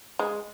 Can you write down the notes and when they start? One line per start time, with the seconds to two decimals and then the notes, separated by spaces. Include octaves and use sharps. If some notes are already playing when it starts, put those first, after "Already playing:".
0.19 G#3